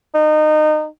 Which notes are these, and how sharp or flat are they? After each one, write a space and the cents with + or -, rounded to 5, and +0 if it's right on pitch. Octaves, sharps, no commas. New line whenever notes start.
D#4 -25